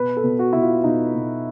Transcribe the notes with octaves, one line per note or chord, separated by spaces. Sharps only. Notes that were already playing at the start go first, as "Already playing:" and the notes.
Already playing: B2 B4
A4
B2
F#4
B2 E4
F4
B2 D#4
B2